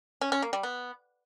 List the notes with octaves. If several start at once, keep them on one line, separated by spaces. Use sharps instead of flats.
C#4
C#4
A#3
G3
B3